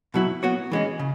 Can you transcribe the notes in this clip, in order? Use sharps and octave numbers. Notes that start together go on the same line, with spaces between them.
B2 F#3 E4
B3 F#4 C#5
E3 G#3 C#4
C#3